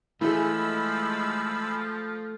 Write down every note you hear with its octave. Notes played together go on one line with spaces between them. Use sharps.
E3 F3 G#3 A3 G#4 B5 E6